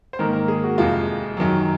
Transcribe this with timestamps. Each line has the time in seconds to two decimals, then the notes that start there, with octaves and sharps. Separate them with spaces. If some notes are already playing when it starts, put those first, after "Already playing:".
0.13 C5
0.19 G#2 D#3 A#3 A#4
0.33 A#4
0.48 G#4
0.64 F#4
0.78 F2 C3 F3 G#3 F4
1.37 F#2 D#3 F#3